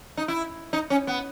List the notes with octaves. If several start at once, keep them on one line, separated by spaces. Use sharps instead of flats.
D#4
E4
D#4
C#4
B3